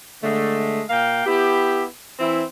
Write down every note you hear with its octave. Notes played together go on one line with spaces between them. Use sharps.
D3 G#3 A3
A#2 A#3 F5 G5
B3 E4 G4
E3 C4 E4